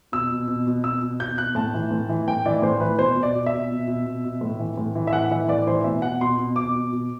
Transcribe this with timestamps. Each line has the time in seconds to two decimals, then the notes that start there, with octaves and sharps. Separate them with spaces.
0.12 B2 E6
0.31 B2
0.48 B2
0.67 B2
0.84 B2 E6
1.02 B2
1.20 B2 G6
1.37 B2 F#6
1.55 A2 A5
1.74 E3
1.91 A2
2.09 E3
2.28 A2 G5
2.45 E3 D5
2.62 A2 C5
2.80 E3 B4
2.99 B2 C5
3.16 B2
3.23 D5
3.35 B2
3.46 E5
3.53 B2
3.71 B2
3.87 B2
4.06 B2
4.24 B2
4.41 A2
4.59 E3
4.77 A2
4.95 E3
5.07 E5
5.13 A2 F#5
5.31 E3 E5
5.48 A2 D5
5.67 E3 C5
5.84 B2 E5
6.02 B2 F#5
6.21 B2 C6
6.38 B2
6.56 B2 D6
6.75 B2
6.92 B2